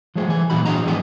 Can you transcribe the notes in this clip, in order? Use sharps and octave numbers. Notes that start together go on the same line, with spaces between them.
F3 G#3 A3 G#4 C5
E3 G#5
A#2 F#3 D#4 F#4 B5
E3 D4 G#4 D#5 A#5
G#2 F3 F#3 B3 G4 G#4